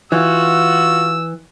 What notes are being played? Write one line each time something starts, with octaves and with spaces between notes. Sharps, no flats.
E3 F4 F#4 E6